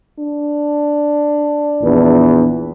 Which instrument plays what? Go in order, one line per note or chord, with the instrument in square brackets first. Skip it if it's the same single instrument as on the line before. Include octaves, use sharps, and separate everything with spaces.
[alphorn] D4
[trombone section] A#1 E2 B4